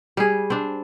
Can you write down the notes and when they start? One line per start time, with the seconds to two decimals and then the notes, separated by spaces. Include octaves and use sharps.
0.17 G3 G#4
0.50 C4 D4